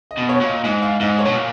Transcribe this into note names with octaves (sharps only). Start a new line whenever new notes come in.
D#5
B2
C#5
A#2
D#5
G#2 D#5
F5
G#2 D#5
C#5
B2
A#2